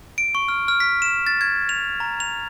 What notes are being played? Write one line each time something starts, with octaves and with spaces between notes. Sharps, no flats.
D7
C#6
F6
F6
B6
E7
A6
G#6
F7
A#5
F7